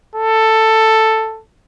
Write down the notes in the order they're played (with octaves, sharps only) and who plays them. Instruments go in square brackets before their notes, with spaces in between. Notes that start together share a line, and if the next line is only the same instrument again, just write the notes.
[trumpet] A4